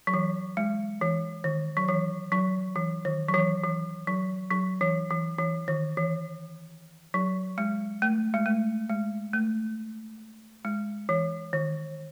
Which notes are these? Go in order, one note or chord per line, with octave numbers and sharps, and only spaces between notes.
F#3
E3
G#3
E3
D#3
F#3
E3
F#3
E3
D#3
F#3
E3
E3
F#3
F#3
E3
E3
E3
D#3
E3
F#3
G#3
A3
G#3
A3
G#3
A3
G#3
E3
D#3